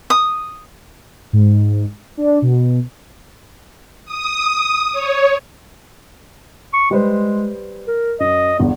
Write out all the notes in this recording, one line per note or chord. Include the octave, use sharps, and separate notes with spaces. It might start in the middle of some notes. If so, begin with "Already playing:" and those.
D#6
G#2
D4
B2
D#6
C#5
C#6
G3 G#3 B4 C5
A#4
F#2 D#5
G1 E2 B3